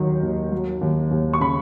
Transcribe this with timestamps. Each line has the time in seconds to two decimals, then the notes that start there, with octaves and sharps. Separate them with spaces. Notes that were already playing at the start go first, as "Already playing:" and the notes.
Already playing: D#2 D#3 F#3
0.23 D#2
0.52 F#3
0.81 D#2
1.11 D#2
1.33 C#6
1.40 C#3 B5